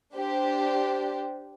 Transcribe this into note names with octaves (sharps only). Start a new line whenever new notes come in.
D4 G4 C5